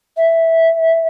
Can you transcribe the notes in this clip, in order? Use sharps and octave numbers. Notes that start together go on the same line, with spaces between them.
E5